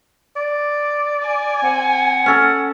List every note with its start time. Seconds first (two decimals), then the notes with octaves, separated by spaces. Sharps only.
0.36 D5
1.27 G#5
1.63 C4 F#5
2.26 C#4 A4